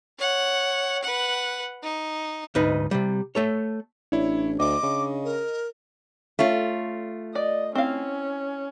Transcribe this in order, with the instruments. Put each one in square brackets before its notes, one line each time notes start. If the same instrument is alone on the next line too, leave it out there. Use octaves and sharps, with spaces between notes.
[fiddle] C#5 F#5
B4 F#5
D#4
[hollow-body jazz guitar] D2 G#2 D#4 B4
C3 G3
A3 A4 C#5
[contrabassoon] A1 [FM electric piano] D4 [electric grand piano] E4 C#5
[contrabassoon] D2 [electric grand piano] D#5 [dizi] D6
[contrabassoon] C#3
[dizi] A#4
[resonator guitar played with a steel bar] A3 F4 [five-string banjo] C#4
[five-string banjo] D5 [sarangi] D#5
[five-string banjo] C4 E4 F5 [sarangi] C#4